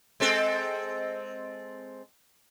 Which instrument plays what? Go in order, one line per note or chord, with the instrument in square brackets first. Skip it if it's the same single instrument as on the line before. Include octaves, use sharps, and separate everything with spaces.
[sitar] G#3 C4 A4